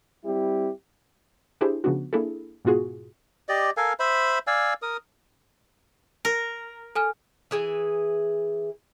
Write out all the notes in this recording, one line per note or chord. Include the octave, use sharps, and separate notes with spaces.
G3 C4 E4 G4
D4 E4 G4 G#4 C5
C#3 F3 B3 D4 F#4
A#3 D4 E4 G#4 A4
G#2 B2 B3 F4 F#4 G#4
G4 D5 D#5
A4 A#4 F5 G#5
C5 E5 B5
D5 F5 G#5 E6
A#4 D#6
A#4
A4 G#5 F6
E3 G#4 G#5